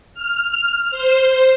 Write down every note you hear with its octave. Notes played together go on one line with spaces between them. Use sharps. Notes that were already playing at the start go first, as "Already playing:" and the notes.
F6
C5